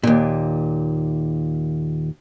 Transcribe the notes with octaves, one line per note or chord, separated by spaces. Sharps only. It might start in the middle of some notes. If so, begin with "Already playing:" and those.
D#2 A#2